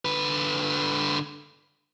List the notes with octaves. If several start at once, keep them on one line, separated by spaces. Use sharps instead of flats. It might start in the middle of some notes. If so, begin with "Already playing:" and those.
D3 B4